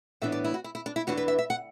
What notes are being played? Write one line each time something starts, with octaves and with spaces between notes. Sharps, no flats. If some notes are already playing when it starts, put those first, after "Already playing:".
A2 E3 B3 D4 E5
D5
E4
F#4
E4
E4
D4
E4
E2 E3 D4 F#4
B4
E5
E5
F#5